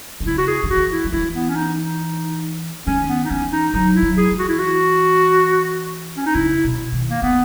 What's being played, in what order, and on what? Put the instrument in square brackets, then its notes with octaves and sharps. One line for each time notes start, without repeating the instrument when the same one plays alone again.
[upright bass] D#3
[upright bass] C#3 [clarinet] E4
[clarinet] F#4
G#4
[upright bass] D#3
[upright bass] E3 [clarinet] F#4
[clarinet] E4
[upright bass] F#3
[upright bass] E3 [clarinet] E4
[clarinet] B3
C#4
D#4
D#4
[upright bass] D#3 [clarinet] C#4
[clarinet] B3
D#4
[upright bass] E3 [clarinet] C#4
[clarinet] D#4
[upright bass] F#3 [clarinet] D#4
[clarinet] E4
[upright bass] F#3
[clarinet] G#4
[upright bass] E3
[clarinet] F#4
E4
F#4
C#4
D#4
[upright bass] C#3 [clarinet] E4
[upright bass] B2
D#3
[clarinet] A#3
[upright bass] D#3 [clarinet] B3